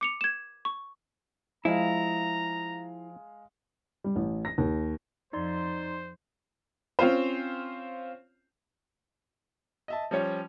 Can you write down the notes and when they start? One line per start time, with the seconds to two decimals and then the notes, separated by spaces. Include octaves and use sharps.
0.01 D6 C#7 F7
0.21 G#6 E7
0.65 C#6
1.65 F3 G#3 E4 D#5 F5 A#5
4.04 G3
4.16 A1
4.45 A#6
4.58 D#2
5.33 F2 D#4 C5 D5 C6
6.99 C4 C#4 F4 C5
9.88 D#5 E5 A5
10.11 F3 G3 C#4 C#5